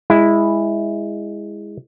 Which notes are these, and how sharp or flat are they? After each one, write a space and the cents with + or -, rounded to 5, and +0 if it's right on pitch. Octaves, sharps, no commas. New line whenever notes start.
G#3 -15 E4 +0